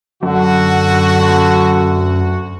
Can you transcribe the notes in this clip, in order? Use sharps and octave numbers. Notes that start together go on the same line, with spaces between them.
F#2 D3 F#4
D2 F#4